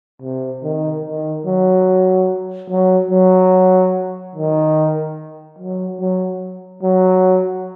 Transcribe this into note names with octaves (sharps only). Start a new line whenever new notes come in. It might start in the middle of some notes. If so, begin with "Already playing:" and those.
C3
D#3
D#3
F#3
F#3
F#3
D#3
F#3
F#3
F#3